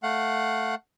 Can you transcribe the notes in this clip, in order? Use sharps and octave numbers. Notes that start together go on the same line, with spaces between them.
A3 F5 F#5